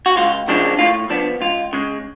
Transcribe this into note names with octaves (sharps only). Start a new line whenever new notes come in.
F#4
C#2 F4
C#3 F3 G#3 D4
A2 F4
F3 B3 D4
C#2 F4
C#3 G#3